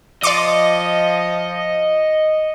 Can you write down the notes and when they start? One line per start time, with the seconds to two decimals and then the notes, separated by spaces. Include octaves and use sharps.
0.23 F3 D5 D#5 C6 D6 D#6 C#7 D#7